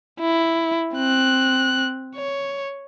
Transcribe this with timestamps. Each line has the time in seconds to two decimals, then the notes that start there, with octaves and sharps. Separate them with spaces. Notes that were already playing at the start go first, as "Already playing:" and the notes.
0.20 E4
0.95 C4 F#6
2.16 C#5